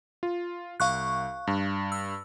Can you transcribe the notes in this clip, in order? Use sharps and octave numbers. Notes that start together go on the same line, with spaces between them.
F4
C2 F5 C#6 F#6
G2
E6